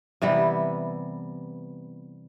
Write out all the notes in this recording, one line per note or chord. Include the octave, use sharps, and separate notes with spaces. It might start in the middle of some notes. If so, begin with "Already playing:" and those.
C3 E3 G3 B3